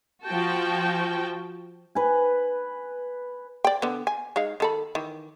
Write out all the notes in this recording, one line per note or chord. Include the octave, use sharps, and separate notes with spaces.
F3 F#4 G5 A5
B4 G#5
D5 G5
D3 B3
G#5
G#3 D#4 F5
D#3 A4 B5
D#3 E3